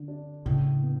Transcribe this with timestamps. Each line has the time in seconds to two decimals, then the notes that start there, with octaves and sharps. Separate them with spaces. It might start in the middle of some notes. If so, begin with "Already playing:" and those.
Already playing: D3
0.08 D4
0.45 A2 C#3
0.82 B3